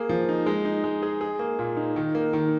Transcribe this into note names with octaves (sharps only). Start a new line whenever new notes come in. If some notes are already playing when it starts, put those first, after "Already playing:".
Already playing: A#3 G#4
F3
D#4
G#3
D#4
G#3
G#4
G#4
A#3
A#2
D#4
D#3
A#3
D#3